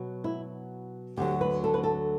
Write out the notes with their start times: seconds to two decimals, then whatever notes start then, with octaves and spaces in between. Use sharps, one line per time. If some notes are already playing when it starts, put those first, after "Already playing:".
Already playing: B2 F#3
0.24 E4
1.17 D2 D3 F#3 G4
1.41 B4
1.64 A4
1.74 B4
1.83 A4